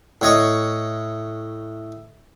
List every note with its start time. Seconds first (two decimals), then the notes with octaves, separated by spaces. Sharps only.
0.21 A2 C#5 D#5 C#6